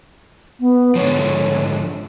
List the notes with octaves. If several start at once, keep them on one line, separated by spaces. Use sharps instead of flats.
B3
G#2 D3 F3 C#5